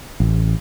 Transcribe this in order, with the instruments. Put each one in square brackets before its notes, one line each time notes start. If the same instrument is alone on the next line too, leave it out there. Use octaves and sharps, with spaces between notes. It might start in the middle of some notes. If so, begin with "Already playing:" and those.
[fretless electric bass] A1